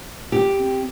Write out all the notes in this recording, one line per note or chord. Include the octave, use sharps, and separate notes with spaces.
G4
C4